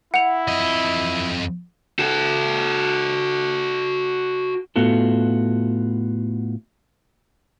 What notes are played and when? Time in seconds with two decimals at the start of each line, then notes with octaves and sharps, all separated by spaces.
0.14 E4 F#5 F7
0.48 F2 D#5
1.99 F#4 A4
4.76 A2 B3 F4 F#4 A4